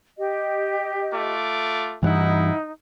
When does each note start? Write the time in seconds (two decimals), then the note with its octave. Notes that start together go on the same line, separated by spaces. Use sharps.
0.18 G4 D#5
1.12 A3 F4 D6
2.03 G2 E3 D#4 E4 F#5